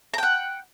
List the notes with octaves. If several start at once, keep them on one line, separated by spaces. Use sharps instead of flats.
F#5 G5 A#5